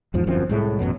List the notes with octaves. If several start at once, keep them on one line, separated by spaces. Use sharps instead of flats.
E2 G#2 F3
G1 F#2 F3 C4
C2 A2 G#3 A3
A1 F#2 B2 F#3